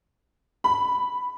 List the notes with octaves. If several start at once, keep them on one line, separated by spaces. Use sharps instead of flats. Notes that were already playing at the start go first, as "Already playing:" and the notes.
B5